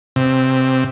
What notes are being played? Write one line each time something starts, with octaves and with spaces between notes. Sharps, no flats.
C3